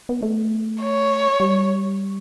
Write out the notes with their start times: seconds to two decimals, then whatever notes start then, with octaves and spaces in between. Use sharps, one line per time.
0.09 B3
0.23 A3
0.81 C#5
1.40 G3